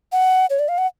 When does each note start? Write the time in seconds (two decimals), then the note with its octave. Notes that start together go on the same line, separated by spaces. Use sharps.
0.12 F#5
0.50 C#5
0.59 D5
0.68 F5
0.78 F#5